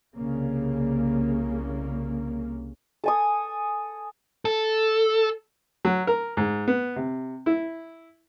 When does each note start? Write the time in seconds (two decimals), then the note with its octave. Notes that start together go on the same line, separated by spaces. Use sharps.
0.15 C2 C#3 A#3
3.04 A4 G#5 D#6
4.45 A4
5.85 F#3
6.07 A#4
6.37 G#2
6.68 B3
6.96 C3
7.46 E4